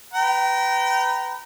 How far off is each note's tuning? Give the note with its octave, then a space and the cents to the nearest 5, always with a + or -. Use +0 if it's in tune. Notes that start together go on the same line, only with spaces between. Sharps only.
B4 +10 G5 -30 A#5 +0